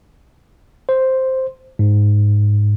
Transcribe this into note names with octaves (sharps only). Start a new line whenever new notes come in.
C5
G#2